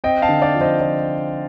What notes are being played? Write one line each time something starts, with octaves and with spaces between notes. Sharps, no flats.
C4 D#5 G5
F5 A5
D3
D5 F5
F3
C5 D#5
F3 D5